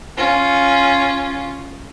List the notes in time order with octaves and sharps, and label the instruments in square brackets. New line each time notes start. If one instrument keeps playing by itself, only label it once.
[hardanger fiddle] C#4 F4